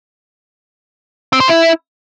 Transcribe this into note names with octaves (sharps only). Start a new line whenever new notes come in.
C4
C5
E4